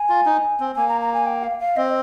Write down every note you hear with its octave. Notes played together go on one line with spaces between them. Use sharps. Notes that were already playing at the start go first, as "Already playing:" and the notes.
Already playing: G#5
F4
D#4
C4
A#3 G#5
A#5
A#5
G#5
G5
F5
F5
C4 D#5